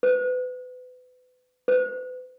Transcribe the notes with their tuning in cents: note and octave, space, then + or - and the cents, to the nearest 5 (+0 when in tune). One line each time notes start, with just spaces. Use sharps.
B4 +30
B4 +35